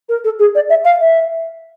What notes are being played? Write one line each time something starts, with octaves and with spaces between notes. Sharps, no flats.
A#4
A4
G#4
D5
E5
F5
E5